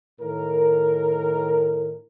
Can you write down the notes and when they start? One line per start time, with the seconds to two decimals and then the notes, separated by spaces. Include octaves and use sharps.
0.20 A2 D#3 A#4